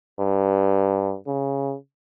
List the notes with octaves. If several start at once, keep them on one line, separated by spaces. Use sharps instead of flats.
G2
C#3